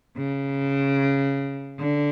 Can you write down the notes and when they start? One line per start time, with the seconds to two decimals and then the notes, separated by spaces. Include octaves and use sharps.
0.17 C#3
1.79 D3